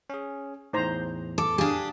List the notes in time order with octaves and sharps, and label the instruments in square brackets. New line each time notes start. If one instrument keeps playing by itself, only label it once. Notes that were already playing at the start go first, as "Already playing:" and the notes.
[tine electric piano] C#4 G#4
[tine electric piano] E2 A2 [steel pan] D#4 C5 A#5
[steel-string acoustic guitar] A4 [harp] D6
[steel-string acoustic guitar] D4 G4 [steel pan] G#4 F5